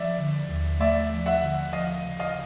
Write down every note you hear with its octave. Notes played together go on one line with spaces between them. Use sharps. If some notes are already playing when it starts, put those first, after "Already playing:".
Already playing: F3 D5 E5
D3
D#2
A3 D5 E5
F3
E5 F#5
D3
F3 D#5 F5
C#3
D#5 F5